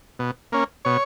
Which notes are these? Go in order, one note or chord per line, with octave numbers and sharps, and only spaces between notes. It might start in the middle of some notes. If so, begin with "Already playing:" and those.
B2
A#3 C#4
B2 C#5